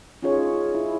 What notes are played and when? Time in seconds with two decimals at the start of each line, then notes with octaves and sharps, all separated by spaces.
0.22 C#4 D#4 F4 G#4 C#5
0.75 E4